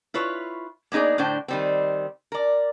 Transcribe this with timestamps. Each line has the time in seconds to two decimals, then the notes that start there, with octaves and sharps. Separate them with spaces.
0.14 E4 F4 B4 C#5
0.92 A#3 B3 D#4 G#4 D5
1.18 A2 D3 D4 C5 G5
1.48 D#3 G3 C4
2.32 A#4 D5